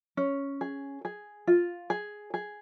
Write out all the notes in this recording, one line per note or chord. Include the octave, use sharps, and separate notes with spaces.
C#4
G#4
G#4
F4
G#4
G#4